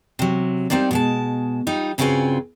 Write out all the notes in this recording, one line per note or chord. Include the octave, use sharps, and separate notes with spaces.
C3 F#3
G3 A#3 C4 D#4 D5
B2 G#3 A5
G3 D#4 F4
G2 C#3 C4 F4 F#4 G#5